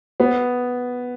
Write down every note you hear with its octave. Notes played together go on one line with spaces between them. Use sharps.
B3